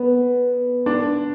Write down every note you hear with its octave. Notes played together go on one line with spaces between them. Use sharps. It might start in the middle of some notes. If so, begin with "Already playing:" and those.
Already playing: B3
D4